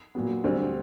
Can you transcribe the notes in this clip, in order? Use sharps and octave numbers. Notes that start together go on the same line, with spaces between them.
A#2 F#3 B3
D2 D3 G3 C4